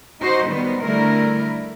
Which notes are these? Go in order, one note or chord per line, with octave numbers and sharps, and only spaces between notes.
D#4 F#4 C5
D#3 G3 B3
D3 G3 A3 E4 A#4